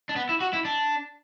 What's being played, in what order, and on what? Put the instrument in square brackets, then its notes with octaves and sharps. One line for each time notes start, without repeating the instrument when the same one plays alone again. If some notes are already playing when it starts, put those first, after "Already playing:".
[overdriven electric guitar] D4
B3
E4
F#4
E4
D4